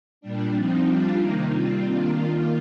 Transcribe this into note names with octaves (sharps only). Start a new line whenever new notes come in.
A#2 G3 D4
F3 C4 D#4
G3 D4 F4
C3 D#3 A#3 D#4
G3 C4 F4
D#3 A#3 D4 F4
D#3 A#3 F4